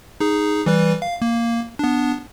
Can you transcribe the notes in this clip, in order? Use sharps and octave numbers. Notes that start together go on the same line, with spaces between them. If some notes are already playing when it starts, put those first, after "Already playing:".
D#4 G#4
E3 G3 B4
F5
A#3
B3 D4